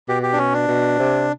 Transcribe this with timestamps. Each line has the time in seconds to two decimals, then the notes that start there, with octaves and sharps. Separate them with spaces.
0.09 B2 G4
0.23 G4
0.33 D4
0.38 C#4
0.53 D4
0.68 B2
0.99 C3